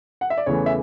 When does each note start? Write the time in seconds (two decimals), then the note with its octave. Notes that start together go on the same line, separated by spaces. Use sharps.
0.21 F#5
0.30 E5
0.38 D5
0.46 E2 C#3 E3 A3 C#5
0.66 E5